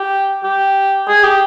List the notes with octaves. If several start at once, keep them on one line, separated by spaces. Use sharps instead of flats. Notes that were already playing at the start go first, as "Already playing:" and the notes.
Already playing: G4
G4
G#4
G4